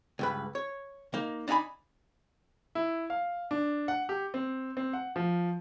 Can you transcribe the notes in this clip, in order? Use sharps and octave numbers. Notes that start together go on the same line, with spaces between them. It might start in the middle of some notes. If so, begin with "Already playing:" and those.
C#2 G2 B4
C#5
A#3 D#4
D4 D#4 E5 G#5 B5
E4
F5
D4
F#5
G4
C4
C4
F#5
F3